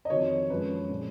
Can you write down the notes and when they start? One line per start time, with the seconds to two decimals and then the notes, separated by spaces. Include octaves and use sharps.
0.05 D#5
0.10 F2 D#3 F#3 C#5
0.50 F#2 F3 G#3 B4
0.90 A#2 F3 G#3